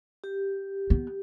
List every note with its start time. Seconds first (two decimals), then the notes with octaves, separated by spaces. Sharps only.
0.24 G4
0.90 B3